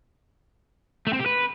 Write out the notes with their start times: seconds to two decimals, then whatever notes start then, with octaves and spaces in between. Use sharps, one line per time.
1.07 A3
1.13 C4
1.19 G4
1.26 B4